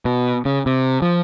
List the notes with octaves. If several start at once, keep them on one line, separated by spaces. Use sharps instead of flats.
B2
C#3
C3
F3